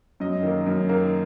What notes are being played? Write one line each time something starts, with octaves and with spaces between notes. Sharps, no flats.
F#2 D#5
D#3 A#3
F#2
D#3 A#3